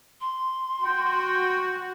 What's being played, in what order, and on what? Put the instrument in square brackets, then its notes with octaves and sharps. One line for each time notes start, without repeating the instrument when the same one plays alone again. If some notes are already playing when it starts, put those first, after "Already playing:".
[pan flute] C6
[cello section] F#4 [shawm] G5